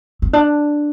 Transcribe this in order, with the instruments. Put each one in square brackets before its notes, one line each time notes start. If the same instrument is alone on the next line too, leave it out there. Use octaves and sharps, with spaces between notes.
[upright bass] C4
D4